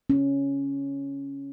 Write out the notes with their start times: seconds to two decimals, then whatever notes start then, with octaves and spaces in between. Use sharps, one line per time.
0.10 C#4